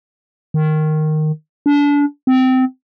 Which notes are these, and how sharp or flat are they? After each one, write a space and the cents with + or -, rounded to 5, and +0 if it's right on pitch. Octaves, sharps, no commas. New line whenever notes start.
D#3 -10
D4 -30
C4 -20